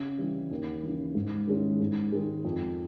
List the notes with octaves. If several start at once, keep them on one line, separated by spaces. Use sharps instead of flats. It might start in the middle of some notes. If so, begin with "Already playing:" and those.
Already playing: C#3
E3 G3
D#2
C#3 E3
G#2
D#3 G#3 C#4 E4
G#2
D#3 G#3
F2